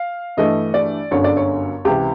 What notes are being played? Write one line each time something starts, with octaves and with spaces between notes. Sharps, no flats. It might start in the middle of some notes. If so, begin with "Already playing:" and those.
Already playing: F5
G2 E3 A3 D#5
D5
G1 F#2 D3 C#5
D5
C#5
C#2 C3 E3 G4